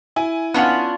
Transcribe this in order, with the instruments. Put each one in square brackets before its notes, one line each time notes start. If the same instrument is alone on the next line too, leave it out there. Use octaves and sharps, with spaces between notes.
[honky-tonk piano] E4 G#5
[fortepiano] B3 F#5 [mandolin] C#4 D4 F4